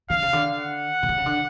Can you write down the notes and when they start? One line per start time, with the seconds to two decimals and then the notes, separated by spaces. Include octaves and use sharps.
0.10 D3 F5
0.22 C#3
0.33 D3
0.60 F#5
1.03 C#3
1.09 D3
1.18 C#3
1.26 D3